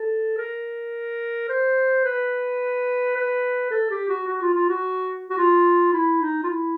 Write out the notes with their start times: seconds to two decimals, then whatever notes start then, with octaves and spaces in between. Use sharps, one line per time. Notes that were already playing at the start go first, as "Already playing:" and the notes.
Already playing: A4
0.38 A#4
1.49 C5
2.04 B4
3.16 B4
3.71 A4
3.90 G4
4.09 F#4
4.27 F#4
4.41 F4
4.54 F4
4.69 F#4
5.30 F#4
5.38 F4
5.93 E4
6.21 D#4
6.43 F4
6.49 E4